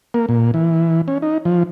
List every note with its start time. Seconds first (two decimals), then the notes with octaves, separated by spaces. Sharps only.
0.14 A#3
0.29 A#2
0.54 E3
1.08 C#4
1.22 D#4
1.45 F3